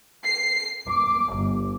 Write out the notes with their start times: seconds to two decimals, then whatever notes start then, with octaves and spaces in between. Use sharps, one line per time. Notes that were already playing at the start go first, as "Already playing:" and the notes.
0.24 C7
0.88 D6
1.35 G1